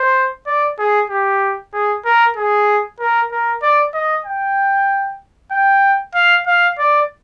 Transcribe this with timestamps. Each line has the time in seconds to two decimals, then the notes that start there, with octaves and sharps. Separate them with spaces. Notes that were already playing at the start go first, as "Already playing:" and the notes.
Already playing: C5
0.46 D5
0.79 G#4
1.10 G4
1.73 G#4
2.05 A#4
2.36 G#4
3.00 A#4
3.31 A#4
3.62 D5
3.94 D#5
4.25 G5
5.52 G5
6.15 F5
6.47 F5
6.78 D5